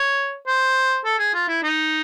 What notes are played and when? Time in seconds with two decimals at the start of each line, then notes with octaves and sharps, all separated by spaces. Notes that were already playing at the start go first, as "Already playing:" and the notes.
Already playing: C#5
0.47 C5
1.05 A4
1.19 G#4
1.34 F4
1.48 E4
1.63 D#4